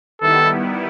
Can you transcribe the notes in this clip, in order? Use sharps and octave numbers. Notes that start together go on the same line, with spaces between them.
D#3 G3 B3 E4 A4